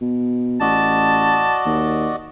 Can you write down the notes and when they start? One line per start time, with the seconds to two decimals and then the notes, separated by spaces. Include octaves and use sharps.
0.01 B2
0.61 A1 F#4 D5 D#5 A5
1.66 D#2